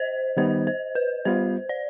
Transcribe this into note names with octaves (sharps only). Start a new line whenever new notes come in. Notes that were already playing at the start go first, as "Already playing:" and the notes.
Already playing: C5 D#5
D#3 G3 B3 D#4 C5
C5
B4
G3 B3 F4 C5
D5